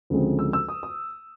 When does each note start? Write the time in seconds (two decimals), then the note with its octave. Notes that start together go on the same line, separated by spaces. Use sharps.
0.10 D2 C#3 F3 G#3 C4
0.39 E6
0.53 E6
0.68 D#6
0.83 D#6